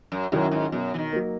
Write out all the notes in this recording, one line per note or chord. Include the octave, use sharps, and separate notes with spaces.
F#2
F#2 D#3 F#3 C#4 E4
G#2
F#2 B2
E3
D#3
F#3 A#3